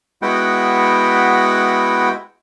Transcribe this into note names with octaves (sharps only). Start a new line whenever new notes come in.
G#3 B3 E4 F#4 F#5 G5